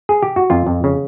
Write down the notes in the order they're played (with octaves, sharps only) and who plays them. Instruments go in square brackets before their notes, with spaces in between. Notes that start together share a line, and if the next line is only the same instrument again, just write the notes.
[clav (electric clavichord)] G#4
G4
F#4
F2 F4
F2
C#3